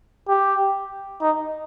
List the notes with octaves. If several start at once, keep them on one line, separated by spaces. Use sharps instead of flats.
G4
D#4